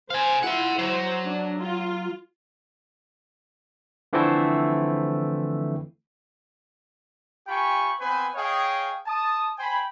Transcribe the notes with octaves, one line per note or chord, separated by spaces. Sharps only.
C5 F5 G#5
E4 F4 F#5 C6
F#3 C5
D4
F4
D3 E3 F3 A3 C4 E4
F4 G4 G5 G#5 B5 C#6
B3 C4 B4 C5 G#5 B5
G#4 C#5 D#5 F5 G5
A5 D#6
C5 G5 G#5 B5